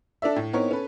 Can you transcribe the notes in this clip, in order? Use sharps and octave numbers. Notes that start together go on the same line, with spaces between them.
D4 A4 D5 E5
A2
B3 C4 D#4 E4 A#4 C#5
C#4 A4 B4